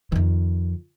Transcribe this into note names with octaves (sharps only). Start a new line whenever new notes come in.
F2 D#3